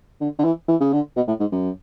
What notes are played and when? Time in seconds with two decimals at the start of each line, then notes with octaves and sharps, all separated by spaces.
0.21 D3
0.39 D3
0.44 E3
0.68 E3
0.81 C#3
0.93 D3
1.16 B2
1.28 A2
1.40 G#2
1.52 F#2